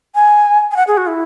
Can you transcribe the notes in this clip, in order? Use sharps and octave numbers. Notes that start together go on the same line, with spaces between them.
G#5
G#5
F#5
G#4
F#4
E4